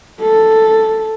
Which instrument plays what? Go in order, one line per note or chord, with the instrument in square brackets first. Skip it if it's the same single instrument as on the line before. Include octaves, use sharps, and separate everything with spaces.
[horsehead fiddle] A4